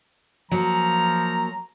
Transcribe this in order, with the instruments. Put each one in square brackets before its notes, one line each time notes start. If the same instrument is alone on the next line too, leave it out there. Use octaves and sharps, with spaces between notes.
[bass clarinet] F3 [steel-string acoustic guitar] F#3 A#3 [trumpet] A#5